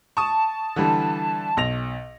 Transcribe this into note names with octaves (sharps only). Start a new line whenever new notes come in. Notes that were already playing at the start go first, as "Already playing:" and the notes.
A5 C#6 D#6
D3 E3 G3
B1 A#6 F7